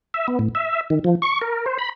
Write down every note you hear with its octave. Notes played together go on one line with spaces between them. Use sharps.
E5
B3
A2
E5
D#3
F3
C#6
A#4
C5
B5